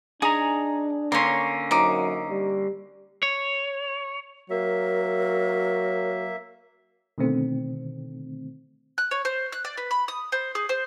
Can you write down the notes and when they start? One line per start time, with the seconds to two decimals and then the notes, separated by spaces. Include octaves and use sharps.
0.22 D4 D#4 G#4 G#5 A#5 D#6
1.12 D3 A#3 C#4 C#5 C6
1.71 F#2 D#4 C5 D6
2.30 G3
3.23 C#5
4.50 F#3 A#3 A#4 E5
7.18 B2 D3 D#3 A3 C4
8.98 F#6
9.11 C#5
9.25 C5
9.52 F#6
9.65 D5
9.78 B4
9.91 B5
10.08 D#6
10.32 C5
10.55 G#4
10.69 C5